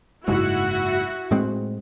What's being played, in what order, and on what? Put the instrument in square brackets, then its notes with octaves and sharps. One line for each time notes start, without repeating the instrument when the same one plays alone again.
[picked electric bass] F#1 G#2 [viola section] E4 F#4
[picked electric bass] A2 G#3 C4